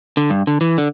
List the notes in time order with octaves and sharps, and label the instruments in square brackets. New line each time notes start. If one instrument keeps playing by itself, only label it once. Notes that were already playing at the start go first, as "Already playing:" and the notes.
[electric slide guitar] D3
G2
D3
E3
D3